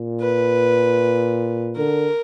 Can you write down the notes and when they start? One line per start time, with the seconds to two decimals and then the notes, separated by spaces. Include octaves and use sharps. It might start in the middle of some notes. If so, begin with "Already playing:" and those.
Already playing: A#2
0.20 B4
1.76 D3 A#4